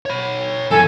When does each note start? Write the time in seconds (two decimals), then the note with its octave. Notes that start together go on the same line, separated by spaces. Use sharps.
0.06 C#5 B5
0.71 F#2 E3 A4 G#5